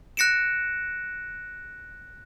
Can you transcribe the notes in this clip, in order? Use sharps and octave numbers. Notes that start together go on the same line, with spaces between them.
F#6 A#6 C#7 D7 E7